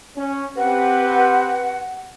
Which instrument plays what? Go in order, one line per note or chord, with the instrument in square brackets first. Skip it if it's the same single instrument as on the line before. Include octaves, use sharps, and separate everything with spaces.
[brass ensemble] C#4
[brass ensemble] C4 G4 B4 [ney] F#5